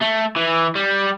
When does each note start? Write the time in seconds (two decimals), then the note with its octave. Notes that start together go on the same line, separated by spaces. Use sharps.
0.01 A3
0.36 E3
0.75 G3